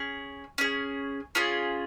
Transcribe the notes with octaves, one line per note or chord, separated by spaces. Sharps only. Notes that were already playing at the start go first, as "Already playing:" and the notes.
Already playing: C#4 G#4
C#4 G#4
C#4 F4 G#4